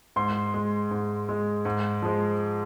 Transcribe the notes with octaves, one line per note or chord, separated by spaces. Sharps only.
G#2 C6
G#3
G#2
G#3
G#2
F3 G#3